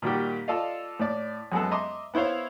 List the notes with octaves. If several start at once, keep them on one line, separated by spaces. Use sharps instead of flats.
A#2 D#3 G3 A#3 F#4 G4
F4 A4 D5 D#5 F5
A2 D5
F#2 G#3 B3 A4
D#5 E5 A#5 C6 D6 D#6
B3 E4 C5 C#5 F5